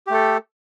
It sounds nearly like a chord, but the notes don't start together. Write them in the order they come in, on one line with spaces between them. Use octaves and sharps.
G4 A3 A4